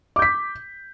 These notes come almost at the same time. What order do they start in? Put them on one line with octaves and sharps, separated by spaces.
D6 G6 B6